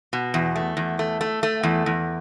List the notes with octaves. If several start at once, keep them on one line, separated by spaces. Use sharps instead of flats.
B2
E2
A3
E2
A3
A3
A3
E2
E2